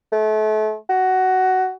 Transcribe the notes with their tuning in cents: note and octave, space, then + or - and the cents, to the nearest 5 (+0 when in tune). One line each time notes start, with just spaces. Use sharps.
A3 -35
F#4 +15